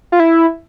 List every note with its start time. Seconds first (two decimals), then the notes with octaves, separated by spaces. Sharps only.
0.12 F4
0.20 E4